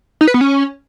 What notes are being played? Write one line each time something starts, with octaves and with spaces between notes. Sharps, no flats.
D#4
B4
B3
C#4